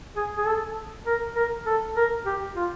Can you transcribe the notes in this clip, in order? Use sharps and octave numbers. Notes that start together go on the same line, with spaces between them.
G#4
G#4
A4
A#4
A#4
A4
A#4
G4
F4